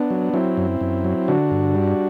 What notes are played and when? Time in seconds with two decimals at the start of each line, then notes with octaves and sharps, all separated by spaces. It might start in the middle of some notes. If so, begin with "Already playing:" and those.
Already playing: B3 D4
0.10 F#3
0.33 F#3 C4 E4
0.57 F#2
0.81 F#2
1.04 F#3
1.28 D3 D4 F#4
1.51 G2
1.75 G3